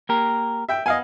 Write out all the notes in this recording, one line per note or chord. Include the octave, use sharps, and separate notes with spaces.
A#3 G4 A#4
E5 G5
B3 D#5 F5 G#5